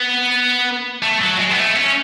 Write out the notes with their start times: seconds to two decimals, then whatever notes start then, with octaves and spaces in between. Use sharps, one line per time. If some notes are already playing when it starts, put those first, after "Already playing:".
Already playing: B3
1.03 A3
1.22 F#3
1.40 G#3
1.51 B3
1.59 A3
1.76 C#4